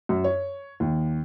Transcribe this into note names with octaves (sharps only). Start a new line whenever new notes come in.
F#2
C#5
D#2